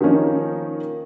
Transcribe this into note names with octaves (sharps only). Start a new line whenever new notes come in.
D#3 F3 A#3 C#4 D#4